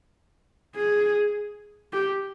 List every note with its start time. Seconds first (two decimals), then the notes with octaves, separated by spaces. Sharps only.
0.75 G#4
1.93 G4